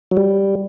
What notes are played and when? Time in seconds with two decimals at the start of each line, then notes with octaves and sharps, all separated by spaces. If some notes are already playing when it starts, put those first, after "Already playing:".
0.11 F#3
0.17 G3